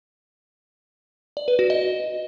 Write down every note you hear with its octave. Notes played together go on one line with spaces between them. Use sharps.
D5
B4
F#4
D#5